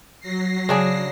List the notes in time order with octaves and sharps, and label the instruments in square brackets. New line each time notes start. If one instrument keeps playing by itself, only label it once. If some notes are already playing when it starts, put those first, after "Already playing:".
[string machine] F#3 A#6 C7
[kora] C#3 D4 G#4